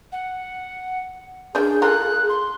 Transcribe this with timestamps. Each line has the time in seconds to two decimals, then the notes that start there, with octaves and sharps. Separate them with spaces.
0.12 F#5
1.55 C#4 D4 G#4 G6
1.82 F4 A4 A#4 F#6
2.29 C6